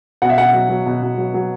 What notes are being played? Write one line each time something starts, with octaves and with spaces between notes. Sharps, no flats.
B2 F#5
E5
B2 F#5
F#3
F#3
B2
B2
F#3
F#3